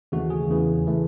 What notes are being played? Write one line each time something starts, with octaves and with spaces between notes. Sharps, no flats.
D#2 C#3 E3 A3 F#4
G#4
E2 C#3 E3
E3 A3